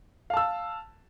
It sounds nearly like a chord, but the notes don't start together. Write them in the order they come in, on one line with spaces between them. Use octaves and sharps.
F5 A5 E6